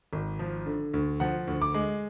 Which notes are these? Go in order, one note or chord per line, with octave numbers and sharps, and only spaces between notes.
G#1
F3
D3
D2
F3 F#5
D2
D6
G#3